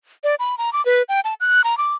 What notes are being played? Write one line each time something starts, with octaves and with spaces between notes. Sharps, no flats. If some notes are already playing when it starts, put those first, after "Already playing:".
D5
B5
A#5
D6
B4
G5
A5
F#6
A#5
D6